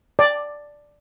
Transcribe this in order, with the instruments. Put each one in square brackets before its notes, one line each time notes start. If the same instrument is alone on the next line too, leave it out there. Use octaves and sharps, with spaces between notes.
[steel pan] D5